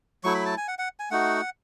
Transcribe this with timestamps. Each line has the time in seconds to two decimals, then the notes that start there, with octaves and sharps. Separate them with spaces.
0.24 F#3 A3 E4 C#6
0.35 B5
0.46 A5
0.57 G#5
0.68 F#5
0.79 F#5
1.00 G#5
1.11 A3 D#4 F#4 F#5